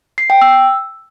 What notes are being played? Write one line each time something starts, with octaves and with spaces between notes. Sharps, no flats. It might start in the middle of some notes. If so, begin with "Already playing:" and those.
C7
G5
E6